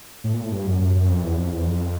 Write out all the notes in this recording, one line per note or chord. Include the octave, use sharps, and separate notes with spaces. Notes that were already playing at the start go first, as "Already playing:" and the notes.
A2
A#2
A2
G2
F#2
F#2
F#2
F2
E2
F2
E2
F2